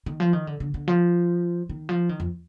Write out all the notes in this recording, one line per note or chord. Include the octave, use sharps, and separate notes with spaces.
D#3
F3
D#3
D3
D3
D3
F3
D#3
F3
D#3
F2